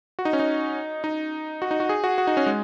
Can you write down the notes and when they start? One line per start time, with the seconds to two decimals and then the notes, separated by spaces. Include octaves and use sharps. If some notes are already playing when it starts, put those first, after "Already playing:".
0.19 F#4
0.25 D#4
0.33 C#4
0.39 D#4
1.04 D#4
1.62 F#4
1.71 D#4
1.80 F#4
1.89 G#4
2.04 F#4
2.18 F#4
2.27 D#4
2.37 C#4
2.46 G#3